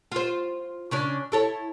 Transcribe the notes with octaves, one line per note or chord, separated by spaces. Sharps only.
F4 C5
C#3 C#4 D4
E4 A4 C#5